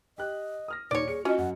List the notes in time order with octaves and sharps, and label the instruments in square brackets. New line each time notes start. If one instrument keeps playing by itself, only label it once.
[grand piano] G4 F#6 [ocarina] D#5
[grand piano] D#6 F6 A#6
[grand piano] D#1 [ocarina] D#4 [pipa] C#5 D5
[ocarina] G#4 [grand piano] C#7
[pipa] C#4 [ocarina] F4 [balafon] F#4 D#5
[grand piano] F#2 [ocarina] F#5